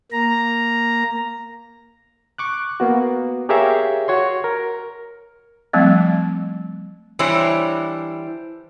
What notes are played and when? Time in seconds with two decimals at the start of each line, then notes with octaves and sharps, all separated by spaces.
0.12 A#3 A#5
2.38 C#6 D6 F#6
2.80 A#3 B3 F#4
3.49 G4 G#4 A#4 C#5 E5 F5
4.08 F#4 C#5 C6
4.44 A#4
5.73 F3 G3 A3 C4
7.19 E3 G3 D4 E4 C5 C#5